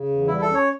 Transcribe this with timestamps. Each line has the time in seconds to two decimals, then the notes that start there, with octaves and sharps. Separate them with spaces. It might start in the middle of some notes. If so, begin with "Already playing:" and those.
Already playing: C#3
0.08 E2
0.27 G3 E4
0.41 A4
0.48 C#4
0.55 C#5